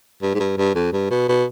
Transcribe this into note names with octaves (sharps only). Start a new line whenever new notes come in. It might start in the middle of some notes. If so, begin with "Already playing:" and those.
G2
G#2
G2
G2
F2
G2
B2
B2